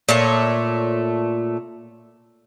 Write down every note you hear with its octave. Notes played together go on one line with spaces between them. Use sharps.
A#2 A3 C#5